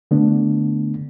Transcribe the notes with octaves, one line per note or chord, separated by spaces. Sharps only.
D3 A3 B3 D4